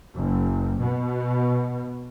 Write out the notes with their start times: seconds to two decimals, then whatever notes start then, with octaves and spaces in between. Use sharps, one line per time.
0.15 F#1
0.79 B2